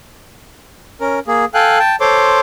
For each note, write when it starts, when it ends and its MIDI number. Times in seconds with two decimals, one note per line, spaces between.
1.01 1.19 61
1.01 1.19 70
1.27 1.45 58
1.27 1.45 68
1.54 1.79 69
1.54 1.79 77
1.54 1.79 79
1.54 1.79 80
1.54 1.79 90
1.79 1.96 79
1.79 1.96 81
2.00 2.41 69
2.00 2.41 72
2.00 2.41 73
2.00 2.41 84
2.00 2.41 86